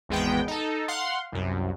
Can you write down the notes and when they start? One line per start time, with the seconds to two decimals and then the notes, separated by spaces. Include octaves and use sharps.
0.09 G#1 E2 G#3 B3 G5
0.48 D#4 A4
0.88 F5 F#5 C6
1.32 C2 F#2